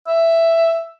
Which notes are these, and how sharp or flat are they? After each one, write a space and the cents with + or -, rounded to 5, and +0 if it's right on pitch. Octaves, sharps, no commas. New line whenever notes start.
E5 +5